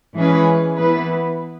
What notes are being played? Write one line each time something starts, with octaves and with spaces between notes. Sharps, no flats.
E3 G#3 C#4 G#4 B4
E3 B3 E4 B4